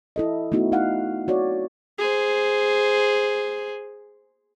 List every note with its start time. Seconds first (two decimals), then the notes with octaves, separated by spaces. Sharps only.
0.16 E4 A4 D#5
0.52 A3 B3 D#4 E4 F#4
0.72 D#4 E4 F5 F#5
1.27 C4 F#4 C#5 D5
1.99 G#4 C5